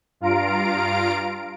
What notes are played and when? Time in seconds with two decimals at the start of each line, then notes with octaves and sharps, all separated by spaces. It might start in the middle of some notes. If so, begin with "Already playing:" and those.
0.21 G2 F4 F5 A#5 D7